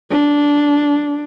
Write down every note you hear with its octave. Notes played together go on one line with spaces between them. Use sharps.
D4